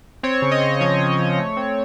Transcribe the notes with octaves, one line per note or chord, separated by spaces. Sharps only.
C4 C#5
C#3
D#5
C#3
F3 C#5
C#3
F3
A3
C4